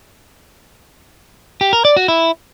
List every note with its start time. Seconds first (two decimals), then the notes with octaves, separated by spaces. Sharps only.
1.61 G4
1.73 A#4
1.85 D5
1.97 F#4
2.08 E4